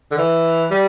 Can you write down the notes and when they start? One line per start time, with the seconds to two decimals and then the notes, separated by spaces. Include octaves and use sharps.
0.11 D3
0.18 E3
0.71 G3